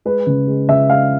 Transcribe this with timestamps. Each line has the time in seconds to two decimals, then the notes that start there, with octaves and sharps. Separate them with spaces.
0.05 G#3 B4
0.27 C#3
0.48 G#3
0.68 C#3 E5
0.89 G#3 F5